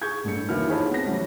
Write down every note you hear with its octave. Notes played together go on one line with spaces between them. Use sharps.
G#4 C#6 G6 G#6
A1 G2 A4 C#7
D#2 E3 E4 F#4 B4 F6
D#4 F4 G#4 C#5 A5 B5
B3 C4 A#6
E3 F#3 G3 A3 C#4